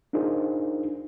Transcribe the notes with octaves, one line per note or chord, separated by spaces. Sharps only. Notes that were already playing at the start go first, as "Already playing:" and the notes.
D4 D#4 F4 G#4 A#4 C5